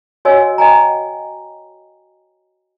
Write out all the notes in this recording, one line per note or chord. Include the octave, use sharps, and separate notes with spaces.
F#4 C#5 D#5 F#5 G#5 E6
D#5 G5 G#5 A#5